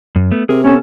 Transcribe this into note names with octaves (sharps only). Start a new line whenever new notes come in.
F#2
A3 B3
C3 G#4 A#4
B3 C#4 A4